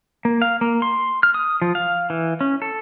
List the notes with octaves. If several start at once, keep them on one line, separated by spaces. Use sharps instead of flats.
A#3
F5
A#3
C6
F6
D#6
F3
F5
E3
C#4
A4